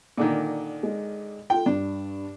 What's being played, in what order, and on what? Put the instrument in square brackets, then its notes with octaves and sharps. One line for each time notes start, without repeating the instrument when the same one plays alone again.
[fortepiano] A#2 D3 D#3
[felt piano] G#3
[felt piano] F4 A4 [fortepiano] G5
[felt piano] G2 [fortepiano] D4